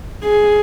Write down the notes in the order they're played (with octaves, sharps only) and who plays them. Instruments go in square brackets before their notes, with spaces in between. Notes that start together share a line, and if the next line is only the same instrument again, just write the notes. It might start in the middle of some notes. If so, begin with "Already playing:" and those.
[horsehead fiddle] G#4